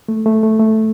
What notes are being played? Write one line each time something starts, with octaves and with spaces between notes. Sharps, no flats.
A3
A3
A3
A3